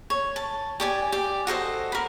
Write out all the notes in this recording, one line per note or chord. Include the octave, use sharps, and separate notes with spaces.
C#5
A5
G4 D5 G#5
G4 D5
F#4 A4 C5 D#5
A#4 B5